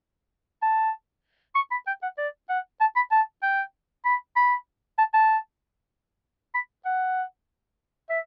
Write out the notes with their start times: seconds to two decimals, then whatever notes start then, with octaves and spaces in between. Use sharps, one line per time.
0.62 A5
1.55 C#6
1.71 B5
1.87 G5
2.02 F#5
2.18 D5
2.49 F#5
2.81 A5
2.96 B5
3.12 A5
3.43 G5
4.05 B5
4.36 B5
4.98 A5
5.14 A5
6.54 B5
6.85 F#5
8.10 E5